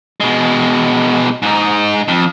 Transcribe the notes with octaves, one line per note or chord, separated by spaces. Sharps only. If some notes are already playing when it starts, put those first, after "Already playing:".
B2 G#3
G#2 D#4
F2